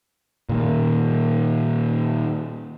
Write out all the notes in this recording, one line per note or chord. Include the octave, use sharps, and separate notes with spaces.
A#2 D#3 A#3